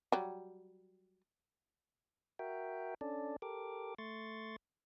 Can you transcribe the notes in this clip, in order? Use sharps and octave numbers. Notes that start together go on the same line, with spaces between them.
F#3 G3
F#4 A#4 E5 G5
C#4 D4 A4 D5
G4 A4 A#4 D6
A3 C6 C#6 A6